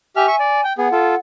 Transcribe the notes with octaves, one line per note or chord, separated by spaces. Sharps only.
G4 E5 G#5 F6
E5 C#6
D5
G5
B3 G#4 F#5
F4 A4